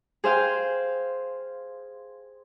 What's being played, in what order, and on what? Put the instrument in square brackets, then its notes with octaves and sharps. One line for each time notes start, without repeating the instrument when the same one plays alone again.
[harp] G#4 C5 F5 G5